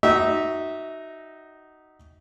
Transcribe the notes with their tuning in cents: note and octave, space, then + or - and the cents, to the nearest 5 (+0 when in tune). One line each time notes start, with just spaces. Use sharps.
D#4 -5 F#4 +20 E5 -20